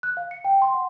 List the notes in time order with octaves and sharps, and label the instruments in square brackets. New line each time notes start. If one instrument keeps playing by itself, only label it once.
[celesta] F#6
F5
C#7
G5
C6
F#5